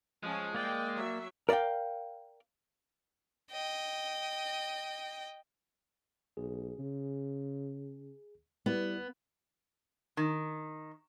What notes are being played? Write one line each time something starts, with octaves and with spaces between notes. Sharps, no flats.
F3 G#3 C#4
A#3 D5 G5
F#3 E5
A#4 D5 E5 F5 G5
D#5 G5
B1 G#4
C#3
G3 B3 E4 B4 D5
D#3